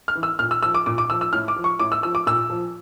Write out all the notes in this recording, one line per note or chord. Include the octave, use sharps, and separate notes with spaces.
F6
E3
E6
A#2 F6
E6
F3 E6
D6
A#2 D6
D6
F3 E6
E6
A2 F6
D6
F3
C#6
A2 D6
E6
F3 E6
D6
A#2 E6
F3